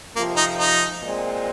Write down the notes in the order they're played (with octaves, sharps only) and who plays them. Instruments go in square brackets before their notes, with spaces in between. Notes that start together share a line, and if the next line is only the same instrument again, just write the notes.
[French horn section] F2 C3 F3 [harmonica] A#3
[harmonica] D#4
D#4
[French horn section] A#2 G#3 C4